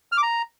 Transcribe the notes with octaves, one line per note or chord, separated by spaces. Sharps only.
F6
D6
A#5